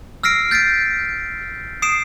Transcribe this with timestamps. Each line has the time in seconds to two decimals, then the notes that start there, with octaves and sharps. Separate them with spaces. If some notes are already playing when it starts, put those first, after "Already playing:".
0.23 E6 F6 A#6 C7 D7
0.51 G6 A6 B6 C7 D7
1.82 D#6 C7 D7 E7